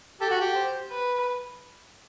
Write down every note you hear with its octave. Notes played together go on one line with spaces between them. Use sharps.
G4 A4
F#4
G4
C5
B4